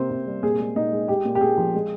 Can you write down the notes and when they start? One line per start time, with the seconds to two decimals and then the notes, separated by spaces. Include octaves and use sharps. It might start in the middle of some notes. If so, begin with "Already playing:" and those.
Already playing: C3 A#3 C5
0.10 C3
0.27 G3
0.43 A#2 G#4
0.60 G#3
0.76 A#2 D#4
0.92 G#3
1.08 G#3 G4
1.25 A#2
1.35 G4
1.41 A#2 G#4
1.58 F3
1.74 G#3